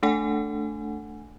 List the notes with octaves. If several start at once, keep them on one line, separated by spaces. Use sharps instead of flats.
A3 D4 A4 F#5 G#5